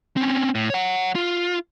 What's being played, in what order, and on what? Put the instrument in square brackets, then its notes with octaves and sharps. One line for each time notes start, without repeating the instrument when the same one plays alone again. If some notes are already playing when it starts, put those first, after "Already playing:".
[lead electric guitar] C4 C#4
A2
C#5 F#5
F4